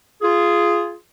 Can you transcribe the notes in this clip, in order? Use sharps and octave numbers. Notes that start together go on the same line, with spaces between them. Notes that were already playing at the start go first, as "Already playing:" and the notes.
F4 G#4